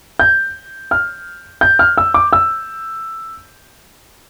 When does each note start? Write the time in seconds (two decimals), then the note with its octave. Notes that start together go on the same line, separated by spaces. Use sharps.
0.20 G6
0.91 F6
1.61 G6
1.79 F6
1.98 E6
2.14 D6
2.33 E6